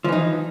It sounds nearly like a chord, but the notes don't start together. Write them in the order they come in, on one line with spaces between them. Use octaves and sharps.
F3 E3 D#4